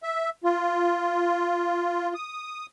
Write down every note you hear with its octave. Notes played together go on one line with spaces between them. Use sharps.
E5
F4
D#6